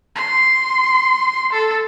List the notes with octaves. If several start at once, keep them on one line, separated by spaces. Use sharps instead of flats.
C6
A4